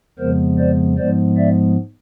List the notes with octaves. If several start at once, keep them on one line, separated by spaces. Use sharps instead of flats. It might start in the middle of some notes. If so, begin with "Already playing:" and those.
F2 C#3 F3 G#3 B3 A#4 C5
C5 D5
G#2 F3 G#3 B3 C5 D5
D5 E5